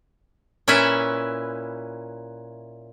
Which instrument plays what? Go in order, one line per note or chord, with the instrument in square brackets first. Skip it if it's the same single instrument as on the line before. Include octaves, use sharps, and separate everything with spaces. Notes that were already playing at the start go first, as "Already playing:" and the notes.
[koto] A#2 C#4 E4 B4 E5